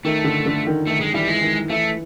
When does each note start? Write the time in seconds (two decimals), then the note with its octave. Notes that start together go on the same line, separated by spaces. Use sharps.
0.05 D#3 A3
0.24 D3
0.46 D3
0.67 D#3
0.87 D#3 A3
1.01 G#3
1.14 E3 G3
1.28 G#3
1.42 D#3
1.70 E3 A3